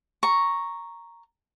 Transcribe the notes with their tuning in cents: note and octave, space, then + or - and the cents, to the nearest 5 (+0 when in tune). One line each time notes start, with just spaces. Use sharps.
A#5 +0 C#6 +0